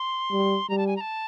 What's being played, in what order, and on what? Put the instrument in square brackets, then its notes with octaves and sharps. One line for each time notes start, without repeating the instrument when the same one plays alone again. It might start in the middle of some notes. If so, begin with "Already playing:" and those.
Already playing: [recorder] C6
[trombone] G3
[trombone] G3 [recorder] A#5
[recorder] A5
G#5
A#5
A5